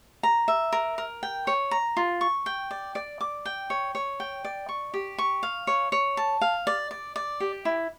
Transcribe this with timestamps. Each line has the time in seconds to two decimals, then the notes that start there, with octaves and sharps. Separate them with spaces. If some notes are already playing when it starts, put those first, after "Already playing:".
0.23 A#5
0.48 E5
0.72 A#4
0.98 A#4
1.23 G5
1.47 C#5
1.71 A#5
1.97 F4
2.21 C#6
2.46 G5
2.71 D5
2.95 D5
3.21 D6
3.45 G5
3.70 C#5
3.95 C#5
4.20 G5
4.45 D5
4.69 C#6
4.94 G4
5.18 C#6
5.43 F5
5.67 C#5
5.92 C#5
6.17 A5
6.41 F5
6.67 D5
6.91 D5
7.16 D5
7.40 G4
7.65 E4